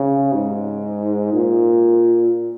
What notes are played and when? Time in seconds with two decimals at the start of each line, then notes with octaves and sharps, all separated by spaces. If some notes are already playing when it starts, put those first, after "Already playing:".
Already playing: C#3
0.33 G#2
1.33 A#2